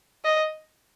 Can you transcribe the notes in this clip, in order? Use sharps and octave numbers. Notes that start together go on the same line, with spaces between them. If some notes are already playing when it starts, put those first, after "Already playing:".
D#5